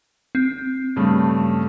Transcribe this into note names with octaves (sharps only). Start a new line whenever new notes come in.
C4
G2 C#3 A3